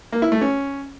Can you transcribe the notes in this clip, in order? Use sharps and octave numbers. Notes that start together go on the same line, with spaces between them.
A#3
E4
A3
C#4